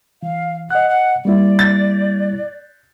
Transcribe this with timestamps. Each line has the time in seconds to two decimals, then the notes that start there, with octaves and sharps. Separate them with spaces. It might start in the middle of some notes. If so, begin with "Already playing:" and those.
0.23 E3 F5
0.70 D#5 F#5 F#6
0.89 F#5
1.25 G3 A#3 E4 D5
1.59 A6